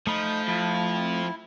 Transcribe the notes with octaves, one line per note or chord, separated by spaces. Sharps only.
F3 A3 D#4 B5 D#6
F2 E4